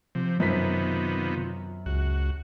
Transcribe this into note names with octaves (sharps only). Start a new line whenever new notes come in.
C3 F3
F#2 C3 D#3 B3 C4 F4 B6
C#2 F#4